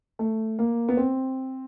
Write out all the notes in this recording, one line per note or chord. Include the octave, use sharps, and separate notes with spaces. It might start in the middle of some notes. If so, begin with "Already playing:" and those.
A3
A#3
B3
C4